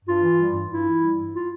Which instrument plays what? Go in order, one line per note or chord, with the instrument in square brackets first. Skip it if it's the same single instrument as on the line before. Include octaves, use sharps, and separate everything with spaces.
[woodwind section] G2 F4
E3
G3
G2
G2 E4
E3
G3
G2
F4